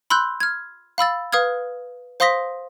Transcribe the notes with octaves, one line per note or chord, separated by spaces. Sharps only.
B5 C6 E6 F#6 G6
F6 G#6
F5 B5 E6 A6
B4 F5 D#6 F6 G#6
C5 F5 C6 D#6 A#6 B6